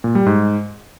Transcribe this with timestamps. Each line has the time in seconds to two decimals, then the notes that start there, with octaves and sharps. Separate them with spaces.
0.04 A#2
0.15 G3
0.26 G#2